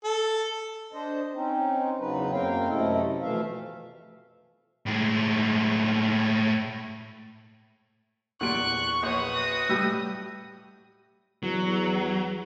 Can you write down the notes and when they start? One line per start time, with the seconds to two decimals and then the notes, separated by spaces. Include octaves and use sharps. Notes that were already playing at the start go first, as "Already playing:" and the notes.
0.04 A4
0.93 D4 C5 D#5
1.35 C4 C#4 D#4
1.99 E2 C#3 F#3 D#4 B4
2.32 F#2 A#3 C4 A#4 F5 G5
2.68 F#2 C3 A3 E4 A4 D#5
3.22 F2 B2 E3 A3 E5 F5
4.86 A2 G#3
8.41 E2 A#2 G3 C#6 F#6 D7
9.03 A#1 B4 C#5 D#6
9.36 F#4
9.69 A2 G3 G4 E6
11.43 E2 F#3